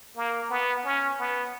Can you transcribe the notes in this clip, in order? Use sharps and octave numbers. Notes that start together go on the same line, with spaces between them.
A#3
B3
C#4
B3